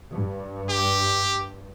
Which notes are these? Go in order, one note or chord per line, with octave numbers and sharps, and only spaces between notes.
G2
G4